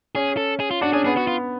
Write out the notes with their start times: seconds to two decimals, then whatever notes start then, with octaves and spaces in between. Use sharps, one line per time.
0.15 C#4 G#4
0.37 A4
0.60 G#4
0.71 F4
0.81 D4 F#4
0.93 C#4 G#4
1.05 B3 G#4
1.17 F#4
1.27 F4